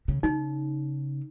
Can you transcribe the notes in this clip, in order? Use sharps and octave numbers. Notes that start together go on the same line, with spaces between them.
C#3
C#3 D#4